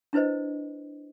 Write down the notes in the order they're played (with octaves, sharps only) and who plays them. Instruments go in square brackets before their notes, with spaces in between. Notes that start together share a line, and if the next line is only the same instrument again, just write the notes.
[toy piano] D4 E4 B4 C5 D#5